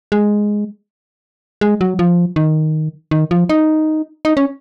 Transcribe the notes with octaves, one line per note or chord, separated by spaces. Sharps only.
G#3
G#3
F#3
F3
D#3
D#3
F3
D#4
D#4
C#4